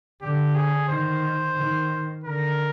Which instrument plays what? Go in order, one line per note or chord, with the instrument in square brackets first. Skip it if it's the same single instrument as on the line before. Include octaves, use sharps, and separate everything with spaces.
[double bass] D3 [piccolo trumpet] G4
[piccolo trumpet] G#4
[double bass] D#3 [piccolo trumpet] C5
[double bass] D#3
[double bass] D3 [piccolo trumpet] A#4